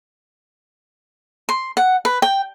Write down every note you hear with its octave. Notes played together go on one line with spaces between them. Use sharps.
C6
F#5
B4
G5